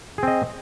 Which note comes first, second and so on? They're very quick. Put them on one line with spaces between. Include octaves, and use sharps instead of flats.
G#4 C4 D#5